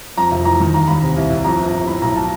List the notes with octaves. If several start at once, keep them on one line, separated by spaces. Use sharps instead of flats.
F2 A#5
F1
E3 A#5
D#3
D#2 A#5
D#2 B5
C3
C2
C2
F2 A#5
G1
G1
A2 B5
B1 A#5
A5